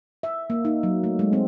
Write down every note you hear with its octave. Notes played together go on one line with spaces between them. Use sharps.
E5
A#3
D#4
F#3
A3
G#3
C4